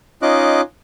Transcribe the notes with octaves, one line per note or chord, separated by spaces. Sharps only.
C#4 D#4 F4 D#5 D6 F#6